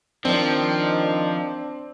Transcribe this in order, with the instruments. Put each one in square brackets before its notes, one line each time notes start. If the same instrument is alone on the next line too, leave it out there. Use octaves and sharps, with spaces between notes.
[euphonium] D#3 [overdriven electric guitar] F3 [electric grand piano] C4 [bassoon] D4